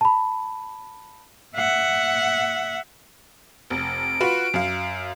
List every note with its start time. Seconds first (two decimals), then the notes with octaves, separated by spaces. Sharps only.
0.01 A5 B5
1.57 E5 F#5
3.70 F1 D7
4.20 F4 F#4 B4
4.54 F#2 F5